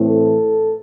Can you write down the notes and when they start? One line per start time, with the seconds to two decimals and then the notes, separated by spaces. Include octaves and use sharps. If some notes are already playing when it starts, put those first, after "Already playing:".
Already playing: A2 E3 A3 C4
0.09 A4